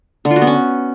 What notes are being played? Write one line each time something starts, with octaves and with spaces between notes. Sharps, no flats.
D3
F4
F#4
B3
C#4